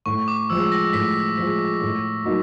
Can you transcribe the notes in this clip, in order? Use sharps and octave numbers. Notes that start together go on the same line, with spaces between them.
A2 C#6
D6
F3 G#3 E6
A#6
A2 B6
F3 G#3 B6
A2
F#3 A#3 D#4